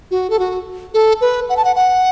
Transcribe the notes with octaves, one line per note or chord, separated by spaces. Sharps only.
F#4
A4
F#4
A4
B4
F#5
A5
F#5
F#5